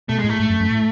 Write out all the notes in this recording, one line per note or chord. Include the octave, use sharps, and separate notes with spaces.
B2 A3
A2 G#3
A3
G#2
F#2
F#2
A2